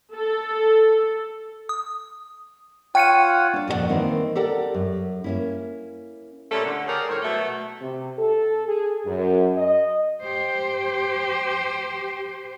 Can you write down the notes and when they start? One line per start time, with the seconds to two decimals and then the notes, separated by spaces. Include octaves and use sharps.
0.15 A4
1.69 D#6
2.95 F4 C#5 F#5 G5 C#7 D#7
3.54 D4 D5
3.68 F2 A#2 F#4 D5 F#5
3.89 D#3 E3 A#3 C4 D#4
4.35 G4 A4 A#4 D5 F#5
4.74 F#2
5.24 A#3 C#4 E4
6.51 A#2 G3 A3 C#4 A4
6.65 D3
6.87 G3 C#4 G#4 A#4 D5
7.09 A2 D3 C5 C#5
7.22 B2 F#3 A3
7.81 C3
8.18 A4
8.67 G#4
9.06 F#2
9.57 D#5
10.22 G4 C5